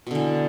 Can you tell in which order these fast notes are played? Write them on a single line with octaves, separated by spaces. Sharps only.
B2 D3 E3